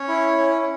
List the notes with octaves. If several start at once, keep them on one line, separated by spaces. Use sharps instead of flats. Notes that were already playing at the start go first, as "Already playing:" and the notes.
Already playing: C#4 C#5
E4
C#4